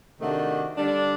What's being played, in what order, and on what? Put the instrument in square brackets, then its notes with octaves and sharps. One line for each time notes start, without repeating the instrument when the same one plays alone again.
[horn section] C3 D#3 A3 D4 F#4
D3 G3 D4